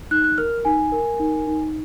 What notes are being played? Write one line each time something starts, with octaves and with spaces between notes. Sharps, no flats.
D#4 F#6
F#6
A#4 F6
D#4 G#5
A#4
D#4
D#4